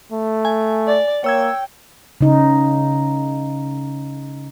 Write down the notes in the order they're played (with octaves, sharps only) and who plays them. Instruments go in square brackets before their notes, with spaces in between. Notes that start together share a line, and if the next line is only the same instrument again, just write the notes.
[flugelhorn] A3
[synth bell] G#5
[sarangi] D5
[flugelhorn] A#3 [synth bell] C#5 E6 G#6 [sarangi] G5
[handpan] C#3 D#4